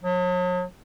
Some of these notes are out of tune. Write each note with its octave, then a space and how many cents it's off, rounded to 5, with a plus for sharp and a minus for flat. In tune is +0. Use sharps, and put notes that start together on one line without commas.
F#3 -40